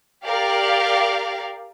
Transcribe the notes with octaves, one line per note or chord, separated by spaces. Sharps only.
G4 A#4 D5 F5